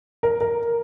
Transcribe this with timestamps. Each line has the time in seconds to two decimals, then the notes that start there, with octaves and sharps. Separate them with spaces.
0.23 A#4
0.41 A#4